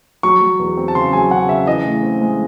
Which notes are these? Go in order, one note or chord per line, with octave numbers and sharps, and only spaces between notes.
F#3 C#6
F#3
E2
C4
A5
C#3 C6
F#3 G#5
C#3 F#5
C#3 E5
E3 D#5
A2
C4
G#3